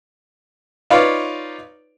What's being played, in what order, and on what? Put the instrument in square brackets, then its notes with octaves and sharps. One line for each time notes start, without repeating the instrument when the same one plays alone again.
[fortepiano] D#4 F4 B4 C#5 D5 F5